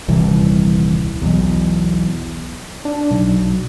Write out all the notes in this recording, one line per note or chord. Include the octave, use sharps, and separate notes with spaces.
D#1 C2 E3
B1 E2
D4
B1